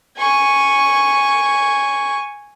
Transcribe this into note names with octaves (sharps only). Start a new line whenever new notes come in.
G#5 C#6